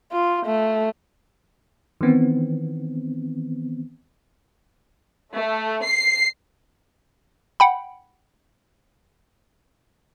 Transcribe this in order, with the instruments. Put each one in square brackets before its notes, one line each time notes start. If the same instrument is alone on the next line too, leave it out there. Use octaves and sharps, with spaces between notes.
[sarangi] F4
A3
[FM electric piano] D#3 E3 B3 C4
[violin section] A3
C7
[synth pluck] F#5 G5 B5